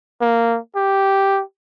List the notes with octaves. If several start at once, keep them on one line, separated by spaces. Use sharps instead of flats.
A#3
G4